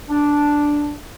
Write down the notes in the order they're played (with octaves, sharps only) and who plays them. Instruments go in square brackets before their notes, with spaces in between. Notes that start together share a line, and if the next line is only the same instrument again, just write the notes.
[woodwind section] D4